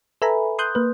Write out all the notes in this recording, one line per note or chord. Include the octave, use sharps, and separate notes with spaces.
A4 B4 E5 G#5 A#5 B5
C6 D#6 F#6 G6
A#3 B4